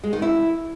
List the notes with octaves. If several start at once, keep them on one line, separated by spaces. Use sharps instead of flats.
G#3
D#3
E4